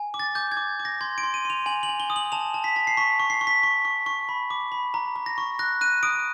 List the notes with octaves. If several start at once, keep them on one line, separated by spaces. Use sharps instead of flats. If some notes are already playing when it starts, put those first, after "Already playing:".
Already playing: G#5
D6
A6
D6 G6
G#6
D6
D6
A#6
C6 G#6
D7
C6
D#7
C6
F7
G#5 F#7
F#7
G#5
G7
D#6
F#7
A5 F7
A5
B6
A5
C7
C#6 B6
C#6
C7
C#6
B6
C#6
C#6
C#6
B5
D6
B5
A#5
A#5
A#6
C#6
F#6 A#6
F#6 D#7
D#6 D7